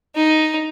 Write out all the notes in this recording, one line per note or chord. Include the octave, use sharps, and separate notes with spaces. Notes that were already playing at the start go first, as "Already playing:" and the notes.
D#4